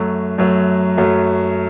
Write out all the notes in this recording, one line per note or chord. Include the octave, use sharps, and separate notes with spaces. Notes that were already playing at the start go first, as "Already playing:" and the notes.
Already playing: F#2 F#3 A3
F#2 F#3 A3
F#2 F#3 A3